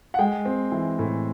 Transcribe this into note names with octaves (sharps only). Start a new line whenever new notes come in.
F#5
G#3 G5
C4
E3
A2